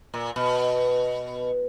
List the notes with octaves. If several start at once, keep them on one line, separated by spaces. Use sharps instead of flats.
A#2
B2